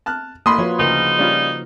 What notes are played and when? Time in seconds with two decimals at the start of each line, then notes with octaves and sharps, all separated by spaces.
0.06 A5 F6 F#6
0.46 A1 A#3 B5 C6 D#6
0.58 F3 F#4 B4 C#5
0.79 D2 C#3 D#4 A#4
1.19 G3 C#4 F4